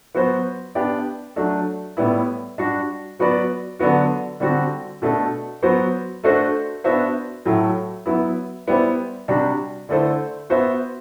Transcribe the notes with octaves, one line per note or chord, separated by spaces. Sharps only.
F#3 B3 F#4 C5
B3 D4 G4 D5
F#3 A3 D4
A2 G3 B3 E4
G3 D4 F#4
F#3 B3 F#4 B4 D5
D3 F#3 B3 F#4
D3 G3 C4 F#4
B2 A3 D4 A4
F#3 B3 F#4 C5
A3 D4 F#4 A4 C5
B3 D4 F#4 C5 E5
A2 F#3 A3 E4
F#3 B3 E4
G3 B3 E4 G4 C5
C3 G3 D4 F#4
D3 A3 E4 A4 C5
B3 F#4 C5 E5